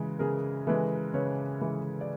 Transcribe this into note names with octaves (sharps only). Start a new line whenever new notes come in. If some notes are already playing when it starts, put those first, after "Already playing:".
Already playing: C#3 E3 G#3 B4
C#3 G#4 A#4
E3 G#3 A4 B4
C#3 B4 C#5
E3 G#3
D5